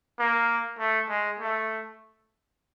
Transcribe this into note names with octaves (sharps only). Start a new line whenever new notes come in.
A#3
A3
G#3
A3